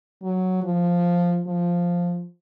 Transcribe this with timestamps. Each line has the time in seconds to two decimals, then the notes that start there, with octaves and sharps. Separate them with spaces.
0.23 F#3
0.64 F3
1.47 F3